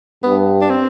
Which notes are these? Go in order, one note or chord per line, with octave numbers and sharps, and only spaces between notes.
G2 B3
D4
C4